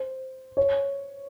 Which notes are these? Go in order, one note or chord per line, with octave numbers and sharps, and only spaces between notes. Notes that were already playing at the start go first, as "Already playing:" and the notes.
Already playing: C5
C#5